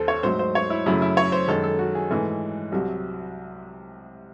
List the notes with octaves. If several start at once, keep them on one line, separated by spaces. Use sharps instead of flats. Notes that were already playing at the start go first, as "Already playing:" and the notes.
Already playing: D#2 A4 C5
C#5
G#2 F#3 A3 C5
C5
C#5
E4
F#2 C#3 F#3 A3 E4
E4
C#5
C5
F#2 D#3 G#3 A4
A4
F#4
G#4
G#2 E3 A3
C2 C3 F#3